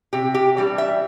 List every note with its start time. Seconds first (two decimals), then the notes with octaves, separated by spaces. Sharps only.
0.13 C3 G4
0.35 G4
0.57 E3 G3 D4
0.78 E5